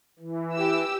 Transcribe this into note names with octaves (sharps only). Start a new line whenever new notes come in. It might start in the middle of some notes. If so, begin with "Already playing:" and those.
E3
G4 E6